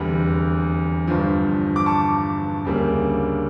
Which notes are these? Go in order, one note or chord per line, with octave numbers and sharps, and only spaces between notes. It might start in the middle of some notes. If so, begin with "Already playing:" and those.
Already playing: F1 E2 D3 G3
G1 G2 F3
D6
A5 C#6
D2 C#3 G3 A#3